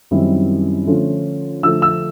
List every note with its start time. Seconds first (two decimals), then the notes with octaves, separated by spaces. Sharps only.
0.11 F#2 D#3 G3 C4 E4
0.87 D3 F3 A3 C#4 F4
1.63 D3 F3 A3 E6
1.82 E6